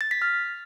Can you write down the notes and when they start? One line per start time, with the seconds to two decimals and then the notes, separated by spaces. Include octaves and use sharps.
0.01 A6
0.11 B6
0.22 F6